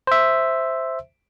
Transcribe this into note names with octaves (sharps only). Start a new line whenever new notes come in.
C5 E5